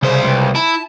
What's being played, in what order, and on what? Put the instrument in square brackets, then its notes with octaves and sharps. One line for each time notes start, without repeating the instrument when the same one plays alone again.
[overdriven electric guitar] C2 C5 [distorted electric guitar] C#3
[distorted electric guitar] C#2
[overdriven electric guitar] E4 [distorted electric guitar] A5